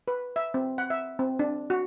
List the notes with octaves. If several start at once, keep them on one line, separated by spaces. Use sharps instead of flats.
B4
E5
C4
F#5
E5
C4
D4
F#4